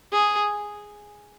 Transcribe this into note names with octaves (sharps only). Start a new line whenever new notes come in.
G#4